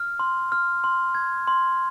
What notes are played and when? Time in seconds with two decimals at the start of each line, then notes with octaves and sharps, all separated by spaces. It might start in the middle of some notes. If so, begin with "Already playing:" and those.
Already playing: F6
0.19 C6
0.52 F6
0.84 C6
1.15 G#6
1.48 C6